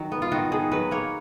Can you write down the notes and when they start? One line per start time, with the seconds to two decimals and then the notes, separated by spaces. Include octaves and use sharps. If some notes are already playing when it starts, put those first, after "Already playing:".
Already playing: D#3 F#3
0.12 B3
0.22 F4
0.32 D#3 F#4
0.52 D#3 G#4
0.71 F#3 B4
0.91 A#3 C#5